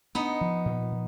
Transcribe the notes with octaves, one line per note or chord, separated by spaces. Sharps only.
B3 D4 D#4
F3
A#2
F3